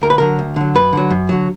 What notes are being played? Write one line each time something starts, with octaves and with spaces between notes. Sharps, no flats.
D2 A#4
B4
D3 F#3 A#4
D2
D3 F#3
F#2 B4
D3 F#3
F#2
D3 F#3